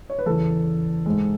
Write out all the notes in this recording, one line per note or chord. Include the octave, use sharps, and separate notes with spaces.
C#5
B4
E2 C#3 E3 A4
G#2 G#3